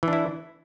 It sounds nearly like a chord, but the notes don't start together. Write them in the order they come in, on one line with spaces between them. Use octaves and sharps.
E3 D4 E4